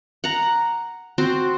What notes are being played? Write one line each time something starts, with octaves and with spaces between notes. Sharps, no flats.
F#5 A#5
C4 F#4 C5